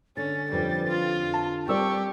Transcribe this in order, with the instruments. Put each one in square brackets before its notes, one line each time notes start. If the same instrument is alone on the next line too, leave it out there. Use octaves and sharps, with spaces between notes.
[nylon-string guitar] D3 [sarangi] C#4 [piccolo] A6
[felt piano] F2 B4 [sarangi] G3
[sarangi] F4
[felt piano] A5
[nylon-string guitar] G3 D5 [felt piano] C4 A#4 E6 [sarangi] G4 [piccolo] C#6